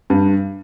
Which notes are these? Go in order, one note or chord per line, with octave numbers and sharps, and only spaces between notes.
G2